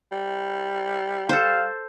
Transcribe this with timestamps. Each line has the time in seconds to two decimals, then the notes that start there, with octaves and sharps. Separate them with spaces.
0.12 G3
1.29 A4 C5 F5